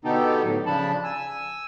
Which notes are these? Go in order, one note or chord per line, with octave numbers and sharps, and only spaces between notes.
B2 D3 B3 D#4 G4 A4
A2 F#3
C#3 F3 D4 A5 B5
G#5 E6